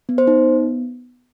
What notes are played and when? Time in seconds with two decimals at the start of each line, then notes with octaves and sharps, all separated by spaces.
0.09 B3
0.18 C5
0.27 D#4
0.37 B3